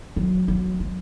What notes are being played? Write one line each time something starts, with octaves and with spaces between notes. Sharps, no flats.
F#3
F#3
G#3